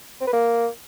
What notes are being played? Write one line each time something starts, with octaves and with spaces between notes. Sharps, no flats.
C4
B4
A#3